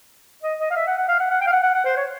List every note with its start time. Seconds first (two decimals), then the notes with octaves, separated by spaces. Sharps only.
0.42 D#5
0.59 D#5
0.70 F5
0.76 E5
0.87 F#5
0.97 F#5
1.08 F5
1.20 F#5
1.30 F#5
1.41 G5
1.47 F5
1.52 F#5
1.63 F#5
1.74 F#5
1.85 C5
1.96 C#5